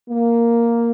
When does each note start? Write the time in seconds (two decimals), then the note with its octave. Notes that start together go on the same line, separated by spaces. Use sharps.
0.10 A#3